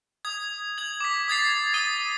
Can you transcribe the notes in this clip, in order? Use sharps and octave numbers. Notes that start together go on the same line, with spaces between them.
D#6 G#6
G#6 F#7
D6 B6
D#6 G#6 A6 C7
D#6 A6 D#7 G7